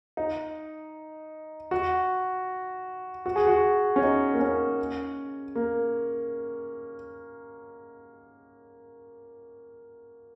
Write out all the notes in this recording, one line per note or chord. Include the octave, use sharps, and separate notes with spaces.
D#4
F#4
F#4
G#4
F#4
C#4
D#4
A#3
C#4
A#3